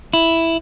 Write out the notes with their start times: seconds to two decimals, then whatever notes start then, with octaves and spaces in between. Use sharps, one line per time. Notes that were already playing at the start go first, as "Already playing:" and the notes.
0.13 E4